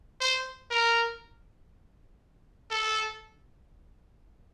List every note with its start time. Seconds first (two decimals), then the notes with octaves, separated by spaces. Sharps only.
0.21 C5
0.71 A#4
2.71 A4